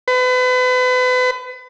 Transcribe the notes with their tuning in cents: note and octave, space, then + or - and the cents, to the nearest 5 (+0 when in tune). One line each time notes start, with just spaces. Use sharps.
B4 +35